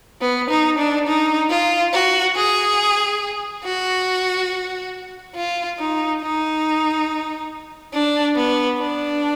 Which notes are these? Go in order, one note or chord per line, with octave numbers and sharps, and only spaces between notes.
B3
D#4
D4
D#4
F4
F#4
G#4
F#4
F4
D#4
D#4
D4
B3
D4